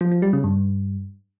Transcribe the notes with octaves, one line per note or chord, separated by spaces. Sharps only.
F3
F3
G3
C#3
G2